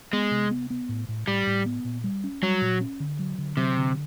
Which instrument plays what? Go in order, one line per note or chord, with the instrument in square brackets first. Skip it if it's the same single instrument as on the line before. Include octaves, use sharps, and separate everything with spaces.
[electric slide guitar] G#3 [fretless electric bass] B3
[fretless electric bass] C3
B3
B3
A2
A2
[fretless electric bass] A2 [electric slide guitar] G3
[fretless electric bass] A2
B3
A#2
G3
C#4
[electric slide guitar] F#3 [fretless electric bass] G3
[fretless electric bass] A#2
C#4
D3
F#3
D3
[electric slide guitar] C3 [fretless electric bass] F#3
[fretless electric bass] D3